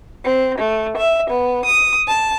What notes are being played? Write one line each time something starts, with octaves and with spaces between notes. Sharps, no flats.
C4
A3
E5
B3
D#6
A5